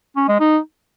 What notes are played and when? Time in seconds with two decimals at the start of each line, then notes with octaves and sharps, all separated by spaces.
0.16 C#4
0.28 G#3
0.40 D#4